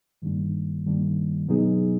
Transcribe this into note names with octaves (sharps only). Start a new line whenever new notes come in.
G2 D#3 G3 A#3 D4
G2 D#3 G3 A#3 D4
B2 F#3 B3 D#4 G#4